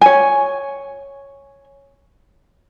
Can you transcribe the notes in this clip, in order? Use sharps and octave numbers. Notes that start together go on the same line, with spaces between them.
C#5 G#5